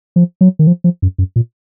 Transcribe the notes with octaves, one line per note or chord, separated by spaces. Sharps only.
F3
F#3
D#3
F3
F3
F#2
F#2
A#2